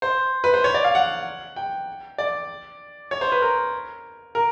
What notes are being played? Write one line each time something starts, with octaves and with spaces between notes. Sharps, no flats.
C5
B4
C5
C#5
D5
F5
F#5
G5
D5
C#5
C5
B4
A#4
A#4